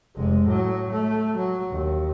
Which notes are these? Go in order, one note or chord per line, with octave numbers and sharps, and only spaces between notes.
F1 G#3
A2 F#3
A3
F#3
D#2